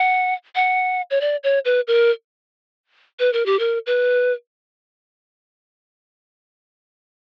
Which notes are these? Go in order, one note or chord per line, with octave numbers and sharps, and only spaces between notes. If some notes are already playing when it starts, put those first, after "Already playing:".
Already playing: F#5
F#5
C#5
D5
C#5
B4
A#4
B4
A#4
G4
A#4
B4